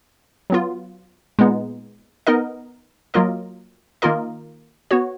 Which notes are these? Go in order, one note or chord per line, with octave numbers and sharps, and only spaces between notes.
F#3 B3 F4
A#2 G#3 B3 D#4
B3 D#4 A#4 D#5
F#3 A#3 F4 A#4 D#5
D#3 A#3 F4 A#4 D#5
B3 F#4 C#5